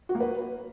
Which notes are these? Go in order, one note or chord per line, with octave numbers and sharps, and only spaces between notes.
F#4
A#3
B4